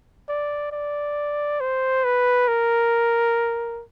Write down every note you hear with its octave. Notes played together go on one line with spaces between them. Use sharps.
D5
D5
C5
B4
A#4